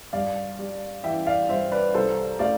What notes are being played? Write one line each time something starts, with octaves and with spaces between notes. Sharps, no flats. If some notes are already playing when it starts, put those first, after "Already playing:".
G2 D5 F5
G3
E3 E5 G5
D5 F5
G2 C5 E5
B4 D5
C2 A4 C5
A3 D5 F5